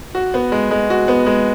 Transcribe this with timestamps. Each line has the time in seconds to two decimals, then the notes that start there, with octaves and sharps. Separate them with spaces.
0.15 F#4
0.34 B3
0.52 G#3
0.71 G#3
0.90 F#4
1.08 B3
1.26 G#3